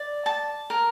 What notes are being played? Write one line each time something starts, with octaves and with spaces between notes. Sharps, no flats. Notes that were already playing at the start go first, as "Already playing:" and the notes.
Already playing: D5
A5
A#4